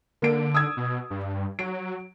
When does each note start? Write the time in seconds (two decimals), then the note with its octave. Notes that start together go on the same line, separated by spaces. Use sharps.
0.22 D3 A#3 D7
0.54 D#6 E6 G#6
0.77 B2
1.10 G2
1.59 F#3 D7